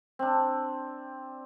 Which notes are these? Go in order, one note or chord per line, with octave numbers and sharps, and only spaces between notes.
C4 D4